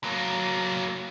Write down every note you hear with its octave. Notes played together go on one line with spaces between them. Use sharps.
F#3 A#3